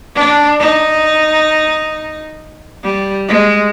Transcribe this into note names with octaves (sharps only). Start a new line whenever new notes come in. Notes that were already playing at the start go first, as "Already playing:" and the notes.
D4
D#4
G3
G#3